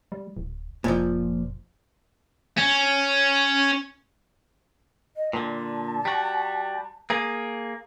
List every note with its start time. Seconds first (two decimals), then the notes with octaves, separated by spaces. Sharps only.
0.12 G3
0.37 D1
0.84 F1 A#2 F3
2.58 C#4
5.17 D#5
5.33 A#2 D3 A5
6.05 G3 F#4
7.10 A#3 G#4